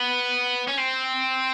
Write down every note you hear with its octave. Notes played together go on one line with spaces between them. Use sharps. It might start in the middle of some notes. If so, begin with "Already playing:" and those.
Already playing: B3
C#4
C4